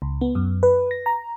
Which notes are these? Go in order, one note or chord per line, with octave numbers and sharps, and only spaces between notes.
C#2
B3
F#2
B4
A#6
A#5